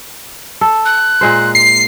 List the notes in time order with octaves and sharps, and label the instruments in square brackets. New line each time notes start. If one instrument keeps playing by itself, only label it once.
[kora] A4
[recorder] F#6
[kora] A#2 G#3 C5
[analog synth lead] C7